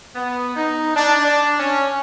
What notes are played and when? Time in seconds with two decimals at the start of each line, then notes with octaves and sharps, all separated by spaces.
0.15 B3
0.56 D#4
0.95 D4
1.25 D4
1.59 C#4